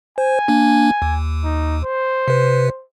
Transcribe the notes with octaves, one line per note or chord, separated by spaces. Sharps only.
C5 G#5
A#3 D4
D#2
D#4
C5
C3 B4